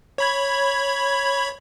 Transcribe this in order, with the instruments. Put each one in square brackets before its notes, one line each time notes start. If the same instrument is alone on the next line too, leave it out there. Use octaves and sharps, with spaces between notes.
[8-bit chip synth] C#5 B5 G#6